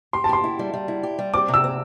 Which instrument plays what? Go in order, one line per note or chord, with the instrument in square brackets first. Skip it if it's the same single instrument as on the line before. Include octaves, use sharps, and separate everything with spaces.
[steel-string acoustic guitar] G4 [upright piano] C6
[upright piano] A5
[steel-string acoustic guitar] G4 [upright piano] C6
[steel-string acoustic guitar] E4
G3
G3
E4
G4
G3
[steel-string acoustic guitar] C4 [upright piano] D6
[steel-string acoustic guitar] C3
[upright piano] E6
[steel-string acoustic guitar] C4